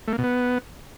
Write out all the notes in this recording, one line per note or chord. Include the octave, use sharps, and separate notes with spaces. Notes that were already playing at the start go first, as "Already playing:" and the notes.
A3
A#3
B2
B3